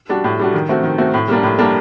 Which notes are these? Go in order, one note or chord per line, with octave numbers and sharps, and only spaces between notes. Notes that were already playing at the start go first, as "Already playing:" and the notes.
G3 D4 F#4
A2
G3 D4 F#4
D#3
A3 C4 F#4
D#3
A3 C4 F#4
A2
G3 A#3 D4
A2
G3 A#3 D4